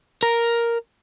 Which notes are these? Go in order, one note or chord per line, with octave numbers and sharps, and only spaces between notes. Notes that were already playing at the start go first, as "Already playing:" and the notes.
A#4